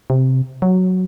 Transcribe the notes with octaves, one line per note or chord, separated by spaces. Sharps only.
C3
F#3